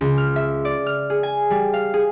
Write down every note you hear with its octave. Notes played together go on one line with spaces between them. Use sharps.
C#2
F6
E5
D5
F6
G#4
G#5
G3
F5
G#4